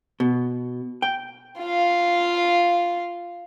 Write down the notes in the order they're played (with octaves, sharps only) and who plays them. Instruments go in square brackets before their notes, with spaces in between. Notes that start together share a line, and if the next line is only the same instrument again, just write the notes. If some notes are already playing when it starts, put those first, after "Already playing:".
[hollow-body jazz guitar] B2
G5
[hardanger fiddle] F4 F5